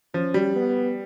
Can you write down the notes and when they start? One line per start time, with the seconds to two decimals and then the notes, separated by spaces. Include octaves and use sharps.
0.14 F3 C#4
0.34 G3
0.56 B3